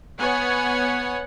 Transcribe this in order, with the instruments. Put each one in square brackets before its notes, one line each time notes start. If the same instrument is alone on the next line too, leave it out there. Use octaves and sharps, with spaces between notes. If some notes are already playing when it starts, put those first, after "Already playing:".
[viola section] B3 C#5 F#5 G#5